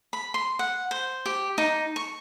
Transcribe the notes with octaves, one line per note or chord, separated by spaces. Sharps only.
B5
C6
F#5
C5
G4
D#4
C#6